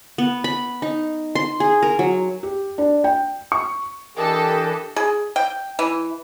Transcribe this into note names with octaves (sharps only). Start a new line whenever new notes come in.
B3
B5
D#4
C6
G#4
A#4
F#3
G4
D4
G5
C#6
E3 D4 G4 A4 A#4 D#5
G#4
G5
E3